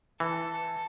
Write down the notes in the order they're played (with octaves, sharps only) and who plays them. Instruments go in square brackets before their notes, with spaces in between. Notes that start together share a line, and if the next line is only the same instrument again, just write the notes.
[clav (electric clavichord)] E3 [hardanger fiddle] A4